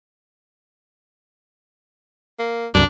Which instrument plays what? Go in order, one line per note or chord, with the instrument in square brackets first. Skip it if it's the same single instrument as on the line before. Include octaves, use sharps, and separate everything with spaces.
[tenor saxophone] A#3
[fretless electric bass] C2 F#2 [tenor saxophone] D4